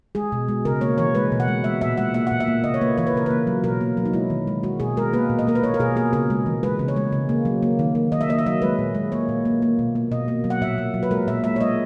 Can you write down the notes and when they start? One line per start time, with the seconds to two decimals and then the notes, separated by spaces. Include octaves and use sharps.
0.15 G#3 G#4
0.32 B2
0.48 G#3
0.65 C#3 A#4
0.81 A#3 C#5
0.98 E3 C#5
1.15 G#3 B4
1.32 B2
1.40 F#5
1.48 G#3
1.64 G#3 E5
1.81 A#2 E5
1.97 G#3 F#5
2.14 A#3 E5
2.27 A#2 F#5
2.40 E5
2.47 A#3
2.64 C#3 D#5
2.74 C#5
2.81 A#3 B4
2.98 E3 C#5
3.07 B4
3.14 C#3 A#4
3.26 A#3 B4
3.47 F#3
3.64 B2 A#4
3.81 A#3
3.97 F#3
4.05 D#4
4.13 G#3 E4
4.30 D#3
4.47 G#3
4.63 G#3 F#4
4.80 B2 G#4
4.97 G#3 A#4
5.13 A#3 B4
5.29 A#2
5.39 D#5
5.47 A#3 A#4
5.55 B4
5.63 A#3 C#5
5.74 A#4
5.79 B2 G#4
5.96 A#3 G#4
6.13 C#3 A#4
6.30 G#3
6.46 E3
6.63 G#3 B4
6.79 C#3
6.88 C#5
6.96 G#3
7.13 C#3
7.29 A#3
7.45 F#3
7.63 A#3
7.79 D#3
7.95 A#3
8.12 D#3 D#5
8.21 E5
8.29 A#3 D#5
8.38 E5
8.46 F#3 D#5
8.62 G#3 B4
8.79 A#2
8.95 G#3
9.12 A#3 C#5
9.29 A#2
9.45 A#3
9.62 A#3
9.79 B2
9.95 A#3
10.12 B2 D#5
10.28 A#3
10.44 F#3
10.50 F#5
10.61 A#2 E5
10.78 A#3
10.94 F#3
11.03 B4
11.11 G#3 A#4
11.28 A#2 E5
11.44 G#3 E5
11.56 C#5
11.61 G#3 D#5